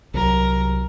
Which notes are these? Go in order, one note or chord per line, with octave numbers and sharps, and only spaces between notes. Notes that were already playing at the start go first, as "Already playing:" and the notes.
C2 F#3 A#4